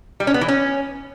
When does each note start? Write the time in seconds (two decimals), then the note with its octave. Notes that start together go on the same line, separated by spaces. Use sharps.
0.20 G3
0.27 C#4
0.34 B3
0.41 E3
0.48 C#4